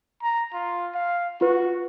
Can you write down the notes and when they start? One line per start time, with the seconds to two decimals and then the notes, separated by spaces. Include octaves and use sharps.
0.22 A#5
0.53 F4
0.95 F5
1.41 F4 F#4 B4